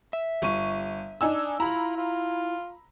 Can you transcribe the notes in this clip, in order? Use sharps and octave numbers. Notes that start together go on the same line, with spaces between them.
E5
G1 C#6 D#7
D4 D#4 G#5 E6
E4 F4 A#5 B5
F4